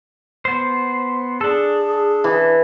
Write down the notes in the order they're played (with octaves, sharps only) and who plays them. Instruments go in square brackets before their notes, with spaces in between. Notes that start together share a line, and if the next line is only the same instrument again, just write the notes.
[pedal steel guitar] B3 C5
[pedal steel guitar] D4 A4 [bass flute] G#4
[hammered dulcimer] E3